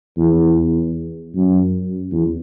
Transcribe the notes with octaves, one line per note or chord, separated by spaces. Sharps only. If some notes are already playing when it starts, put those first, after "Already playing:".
E2
F#2
E2